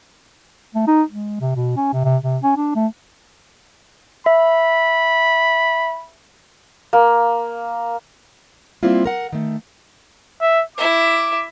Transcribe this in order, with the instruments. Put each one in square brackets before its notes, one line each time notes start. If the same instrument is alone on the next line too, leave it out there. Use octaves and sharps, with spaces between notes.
[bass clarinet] A3
D#4
G#3
C3
B2
C#4
C3
C3
C3
C#4
D4
A3
[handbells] E5 [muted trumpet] B5
[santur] A#3
[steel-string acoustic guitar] G3 A#3 C4 E4 F4
A#4 F#5
D#3 A3
[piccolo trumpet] E5
[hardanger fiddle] E4 E5 [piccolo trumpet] D6